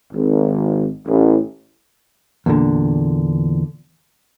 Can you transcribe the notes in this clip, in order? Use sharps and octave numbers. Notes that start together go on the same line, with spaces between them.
G#1
A1
E2 A#2 D3